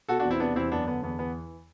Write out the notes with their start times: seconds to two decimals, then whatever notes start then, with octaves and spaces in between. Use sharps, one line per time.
0.08 B2 F#4 A4
0.19 D4 F#4
0.25 E2
0.30 C4 E4
0.40 C3 B3 D4
0.56 E2 C4 E4
0.72 F#2 B3 D4
0.87 D3 B3
1.03 E2 B3
1.19 E3 B3